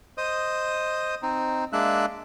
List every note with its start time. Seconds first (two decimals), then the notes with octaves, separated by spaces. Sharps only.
0.17 C5 D#5 D#6
1.22 C4 D#4
1.73 G#3 A#3 D4 E5 F#6